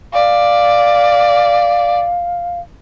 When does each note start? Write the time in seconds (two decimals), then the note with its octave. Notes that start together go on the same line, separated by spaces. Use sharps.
0.13 D5 F5